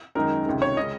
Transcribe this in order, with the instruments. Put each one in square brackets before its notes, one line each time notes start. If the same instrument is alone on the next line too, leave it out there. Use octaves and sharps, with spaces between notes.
[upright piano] F#2 D#3 G#3 D#4 A#4
C#2 C3 D#3
C#5
C#3 G#3 C#4 D#5